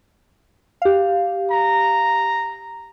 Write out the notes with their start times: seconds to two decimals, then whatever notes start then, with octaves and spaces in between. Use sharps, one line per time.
0.82 G4 F5
1.51 A#5